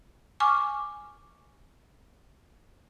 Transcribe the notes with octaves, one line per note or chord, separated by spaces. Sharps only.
G#5 C#6 D6 F6